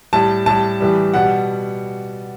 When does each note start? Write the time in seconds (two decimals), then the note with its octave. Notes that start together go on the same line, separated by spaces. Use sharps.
0.13 A2 G3 A5
0.46 A2 G3 A5
0.81 A2 E3 G3
1.14 B2 G3 F#5